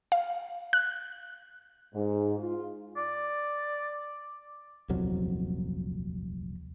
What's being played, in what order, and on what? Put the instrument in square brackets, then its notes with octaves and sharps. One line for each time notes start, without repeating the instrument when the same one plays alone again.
[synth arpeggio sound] F5
F#6
[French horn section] G#2
F4
[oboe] D5
[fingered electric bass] D#1 C2 F2 F#3